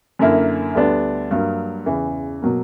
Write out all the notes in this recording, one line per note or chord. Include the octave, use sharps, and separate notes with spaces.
F#2 D3 A#3 E4
D2 D3 G3 B3 D4
G2 F#3 A#3
E2 C#3 E3
B2 F#3 A#3